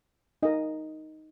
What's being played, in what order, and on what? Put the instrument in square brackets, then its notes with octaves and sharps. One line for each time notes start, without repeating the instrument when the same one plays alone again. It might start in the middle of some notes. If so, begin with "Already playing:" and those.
[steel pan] D#4 A#4 D#5